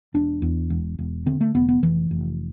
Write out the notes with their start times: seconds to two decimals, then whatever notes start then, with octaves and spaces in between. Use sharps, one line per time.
0.14 E1 D4
0.42 E2
0.70 E1
0.99 E1
1.26 D3 C4
1.41 A3
1.55 F1 B3
1.69 B3
1.83 F1 E3
2.11 F1